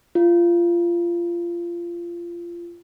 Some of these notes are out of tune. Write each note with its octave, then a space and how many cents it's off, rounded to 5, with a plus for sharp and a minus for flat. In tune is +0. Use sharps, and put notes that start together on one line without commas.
F4 -20